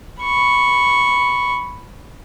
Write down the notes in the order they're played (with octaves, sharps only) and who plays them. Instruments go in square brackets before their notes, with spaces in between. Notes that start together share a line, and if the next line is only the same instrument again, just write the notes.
[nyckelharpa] B5 C#6